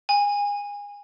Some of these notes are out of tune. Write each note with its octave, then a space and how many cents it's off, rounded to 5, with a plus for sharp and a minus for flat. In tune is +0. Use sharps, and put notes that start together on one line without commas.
G#5 -30